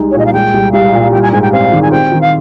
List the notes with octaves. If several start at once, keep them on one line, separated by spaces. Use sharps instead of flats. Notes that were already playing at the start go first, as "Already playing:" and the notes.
Already playing: C2 G#3 D#4
C#5
A#2 D#5
F5
G#3 G5
C2
C2 F5
A#2
G3 G5
G#5
G#2 G#5
G5
C4 F5
D#3
G#5
C4 G5
D#3
F5